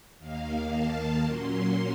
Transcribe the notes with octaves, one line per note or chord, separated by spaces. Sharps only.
D#2 D#3 A#3 F5
A5
A#2 F#3 A#3 C#4 C6